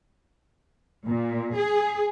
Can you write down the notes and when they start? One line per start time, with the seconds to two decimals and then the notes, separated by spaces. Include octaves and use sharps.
1.07 A#2
1.56 G#4